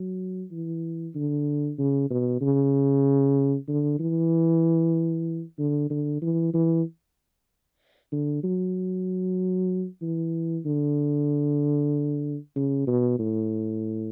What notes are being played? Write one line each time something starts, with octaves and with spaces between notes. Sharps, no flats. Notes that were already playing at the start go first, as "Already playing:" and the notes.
Already playing: F#3
E3
D3
C#3
B2
C#3
D3
E3
D3
D3
E3
E3
D3
F#3
E3
D3
C#3
B2
A2